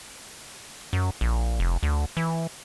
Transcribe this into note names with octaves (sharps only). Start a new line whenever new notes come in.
F#2
A#1
F1
D2
E3